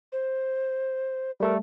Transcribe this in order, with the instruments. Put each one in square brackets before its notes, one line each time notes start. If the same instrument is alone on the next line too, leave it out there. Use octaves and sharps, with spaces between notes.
[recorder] C5
[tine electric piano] G3 A3 A4 [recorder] A#4